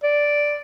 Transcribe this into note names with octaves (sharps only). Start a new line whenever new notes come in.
D5